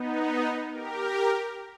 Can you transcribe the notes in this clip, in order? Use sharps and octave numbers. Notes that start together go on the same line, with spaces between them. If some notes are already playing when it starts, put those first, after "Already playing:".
Already playing: B3 D#4
G4 A#4